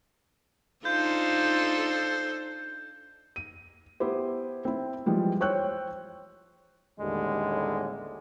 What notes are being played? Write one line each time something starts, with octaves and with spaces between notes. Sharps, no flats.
D4 D#4 F4 A4 C5 G6
D#7
B3 E4 G4 C5
C4 E4
E3 F3 G3 G#3
C5 C#5 G5 C#6 E6 F#6
A1 D#2 D3 G3 G#3